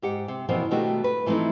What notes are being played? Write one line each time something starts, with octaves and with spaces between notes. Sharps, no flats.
G#2 G4 F#5
C3
B2 E3 F3 A#3 C4
B2 D#3 A3 D4 F#4 G4
B4
E3 F3 A3 C4 D#4 E4